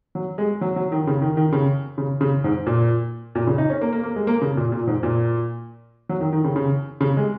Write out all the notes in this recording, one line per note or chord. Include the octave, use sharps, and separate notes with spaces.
F#3
G#3
F#3
F#3
D#3
C#3
D#3
D#3
C#3
C#3
C#3
G#2
A#2
A#2
C#3
D#4
C#4
A#3
A#3
A#3
G#3
A#3
C#3
A#2
A#2
G#2
A#2
F#3
D#3
D#3
C#3
C#3
C#3
G#3